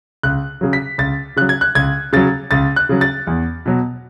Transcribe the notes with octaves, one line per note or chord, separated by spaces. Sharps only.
C#2 F#6
C#3 F#3
B6
C#2 A6
C#3 F#3 F#6
G#6
F#6
C#2 G#6
C#3 F#3 A6
C#2 A6
F#6
C#3 F#3
A6
E2
B2 F#3